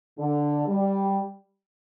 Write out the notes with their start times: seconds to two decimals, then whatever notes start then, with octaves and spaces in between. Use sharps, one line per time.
0.18 D3
0.67 G3